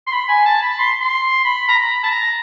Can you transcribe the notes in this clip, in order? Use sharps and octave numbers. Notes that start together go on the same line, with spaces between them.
C6
B5
G#5
A5
B5
C6
C6
B5
A#5
B5
A5
A#5